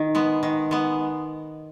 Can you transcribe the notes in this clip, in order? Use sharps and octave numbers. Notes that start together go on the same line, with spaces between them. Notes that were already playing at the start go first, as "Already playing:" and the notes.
Already playing: D#3
G#3 B3
D#3
G#3 B3